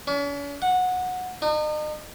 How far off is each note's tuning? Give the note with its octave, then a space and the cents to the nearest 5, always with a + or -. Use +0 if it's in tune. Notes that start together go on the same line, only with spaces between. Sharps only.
C#4 +45
F#5 -15
D#4 -40